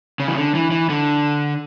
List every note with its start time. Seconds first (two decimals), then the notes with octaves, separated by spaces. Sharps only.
0.20 C#3
0.28 E3
0.37 D3
0.55 E3
0.71 E3
0.89 D3